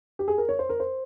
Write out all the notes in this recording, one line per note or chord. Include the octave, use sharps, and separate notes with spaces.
G4
G#4
A#4
C#5
C5
A#4
C5